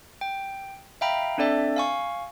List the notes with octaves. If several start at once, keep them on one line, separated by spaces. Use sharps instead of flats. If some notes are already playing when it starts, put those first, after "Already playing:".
G5
E5 F5 G5 A#5 B5
C4 D4 A4 D5 E5
F5 G#5 C#6